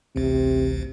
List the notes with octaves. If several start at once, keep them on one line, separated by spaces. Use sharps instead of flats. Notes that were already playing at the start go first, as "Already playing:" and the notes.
A1 D2 C3